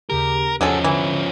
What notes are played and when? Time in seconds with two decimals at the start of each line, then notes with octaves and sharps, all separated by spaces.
0.10 D#2 C#3 G4 A#4
0.61 E2 F3 F#3 G#3 C#4 A4
0.84 D3 E3